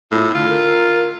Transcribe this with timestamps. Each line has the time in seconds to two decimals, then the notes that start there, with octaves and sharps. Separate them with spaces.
0.12 A2 F4
0.34 D3 F4
0.49 A#4